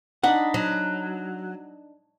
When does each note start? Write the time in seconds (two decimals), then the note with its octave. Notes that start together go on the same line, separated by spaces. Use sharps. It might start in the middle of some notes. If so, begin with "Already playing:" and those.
0.24 D4 D#4 F#5 B5
0.54 F#3